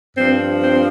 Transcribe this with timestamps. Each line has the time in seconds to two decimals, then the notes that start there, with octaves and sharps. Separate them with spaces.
0.17 G2 F3 C4
0.63 C4